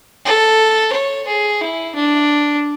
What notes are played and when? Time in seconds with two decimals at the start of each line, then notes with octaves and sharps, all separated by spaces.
0.25 A4
0.93 C#5
1.27 G#4
1.61 E4
1.95 D4